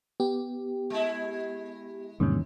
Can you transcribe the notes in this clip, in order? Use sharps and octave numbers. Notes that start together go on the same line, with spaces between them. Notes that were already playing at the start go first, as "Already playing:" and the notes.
B3 G4
G#3 E4
E2 G#2 C3 D#3 G3 A#3 C#4